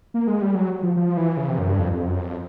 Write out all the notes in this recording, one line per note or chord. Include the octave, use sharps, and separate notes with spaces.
A#3
G#3
G3
F#3
F3
F3
E3
C#3
C3
F#2
G2
F2
F2
F#2
F2